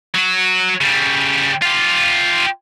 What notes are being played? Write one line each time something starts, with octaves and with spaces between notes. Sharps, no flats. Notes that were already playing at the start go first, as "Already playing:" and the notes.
F#3 F#4
C#3 G3
F4 G4